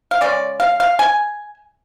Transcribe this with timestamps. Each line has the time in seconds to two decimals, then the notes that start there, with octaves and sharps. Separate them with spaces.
0.11 F5
0.21 C#3 G#3 C#4 D5
0.60 F5
0.80 F5
0.99 G#5